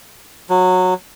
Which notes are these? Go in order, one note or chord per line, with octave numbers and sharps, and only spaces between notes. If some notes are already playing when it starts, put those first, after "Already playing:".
F#3